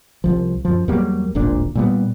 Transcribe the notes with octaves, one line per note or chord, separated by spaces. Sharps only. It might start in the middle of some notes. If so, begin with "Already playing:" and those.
C2 F3
F#2 F3
E2 F#3 G3 A#3
D1 G#1 A#2 D4
A#2 G3 B3